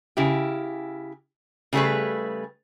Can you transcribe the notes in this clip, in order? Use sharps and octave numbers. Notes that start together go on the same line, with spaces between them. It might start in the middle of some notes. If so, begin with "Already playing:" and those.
C#3 E4 G4
C#3 G3 A3 B3 G#4 B4